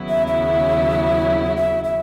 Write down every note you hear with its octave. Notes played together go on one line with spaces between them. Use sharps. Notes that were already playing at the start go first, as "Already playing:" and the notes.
Already playing: D#2 C#3 F#3 B3 E4
E5
E5
E5
E5